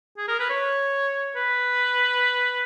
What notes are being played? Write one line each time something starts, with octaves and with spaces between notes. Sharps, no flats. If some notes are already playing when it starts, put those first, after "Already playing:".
G#4
A#4
B4
C#5
B4